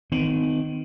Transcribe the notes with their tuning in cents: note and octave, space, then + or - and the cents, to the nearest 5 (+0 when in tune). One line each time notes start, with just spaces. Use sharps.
D#3 +0 C4 -40